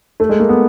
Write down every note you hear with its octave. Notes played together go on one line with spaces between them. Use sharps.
A3
G#3
A#3
B3